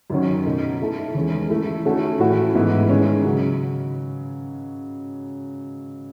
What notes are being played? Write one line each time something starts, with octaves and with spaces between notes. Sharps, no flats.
F#2 D#3 F#3 C#4
B2 A3 D#4
D#3 A3 E4 A4
E2 D#3 G#3 C#4
E3 A3 E4
D#3 A3 C#4 F#4 A4
A2 E3 A3 C#4 F#4
G#2 E3 B3 E4 B4
D#3 G#3 C#4
C#3 F#3